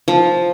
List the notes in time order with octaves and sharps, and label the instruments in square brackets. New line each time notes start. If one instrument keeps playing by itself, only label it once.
[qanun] F3